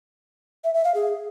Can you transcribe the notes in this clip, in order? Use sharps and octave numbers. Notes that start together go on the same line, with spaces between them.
E5
E5
F5
G#4